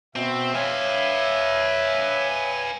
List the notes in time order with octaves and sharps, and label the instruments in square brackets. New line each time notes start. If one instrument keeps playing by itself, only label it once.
[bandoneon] B2 [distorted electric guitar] C4 [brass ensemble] E5
[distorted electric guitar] B4 F5 [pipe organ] C#5 [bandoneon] G#5